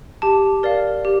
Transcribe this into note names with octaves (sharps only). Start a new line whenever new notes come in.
G4 A5
A#4 D5 F5
G4